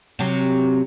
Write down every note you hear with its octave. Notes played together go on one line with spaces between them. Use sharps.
C3 F#3